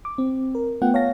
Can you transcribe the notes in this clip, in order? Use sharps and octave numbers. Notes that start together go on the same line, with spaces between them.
D6
C4
A#4
A3 B3 F4 F#5 G5
C#5 F5 A5 A#6